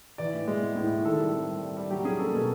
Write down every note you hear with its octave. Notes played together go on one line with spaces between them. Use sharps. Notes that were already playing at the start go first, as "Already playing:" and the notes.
E3 D5
A2
G#3
B3
A2
A2
D#3 A4
G3
C4
G3
G3
G3
F#3 G4
C#4 G#4
A#3 A4
B2 A4